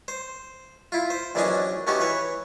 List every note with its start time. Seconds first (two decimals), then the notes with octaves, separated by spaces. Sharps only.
0.08 C5
0.92 E4 F4
1.10 C5
1.35 A#1 E3 F#3 C#4 D4 D#5
1.87 A3 B3 C#4 D#4 F#4 G4
2.00 E3 B4 C#5